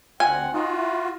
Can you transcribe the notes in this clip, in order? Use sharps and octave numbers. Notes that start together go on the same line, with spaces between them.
D2 C4 F#5 G#5
D#4 F4 F#4
E4